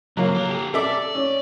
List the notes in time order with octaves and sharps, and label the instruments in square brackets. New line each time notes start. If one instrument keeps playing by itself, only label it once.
[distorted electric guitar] C#3 F3 [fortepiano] F#3 A#3
[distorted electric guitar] A4 A#5
G4 A4
[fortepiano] A4 E5 D6 [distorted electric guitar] D5
[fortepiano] C#4